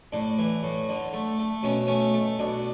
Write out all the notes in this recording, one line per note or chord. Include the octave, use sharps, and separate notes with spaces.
A2 D4
E3
A2
D3
A3
A3
B2 C#4
A3 C#4
A3
B2 D4